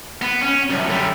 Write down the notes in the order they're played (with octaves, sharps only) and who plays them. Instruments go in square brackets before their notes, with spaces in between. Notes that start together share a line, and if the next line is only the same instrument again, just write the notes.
[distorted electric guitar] B3
C#4
C2 F#2
D3 G3